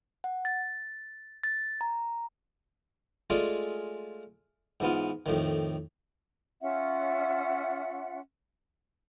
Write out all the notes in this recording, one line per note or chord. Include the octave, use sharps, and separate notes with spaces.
F#5
A6
A6
A#5
G#3 A3 F4 G#4 D5
G#2 E3 B3 F4
F2 A2 D#3
C#4 F4 E5 F#5